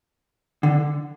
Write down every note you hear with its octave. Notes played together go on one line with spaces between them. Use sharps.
D3